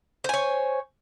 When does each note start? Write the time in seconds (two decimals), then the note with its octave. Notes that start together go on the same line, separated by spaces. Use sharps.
0.24 C5
0.29 G#5
0.34 C#5